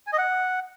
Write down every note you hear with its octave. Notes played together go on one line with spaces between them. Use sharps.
G#5
D#5
F#5